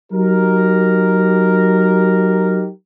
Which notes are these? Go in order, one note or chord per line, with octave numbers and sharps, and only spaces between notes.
F#3 D#4 G4 A#4